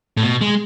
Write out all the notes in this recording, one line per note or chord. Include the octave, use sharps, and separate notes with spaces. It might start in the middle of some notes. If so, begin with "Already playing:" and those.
A2
B2
G#3